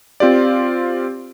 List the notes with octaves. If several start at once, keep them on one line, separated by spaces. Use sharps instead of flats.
C4 F4 G4 D5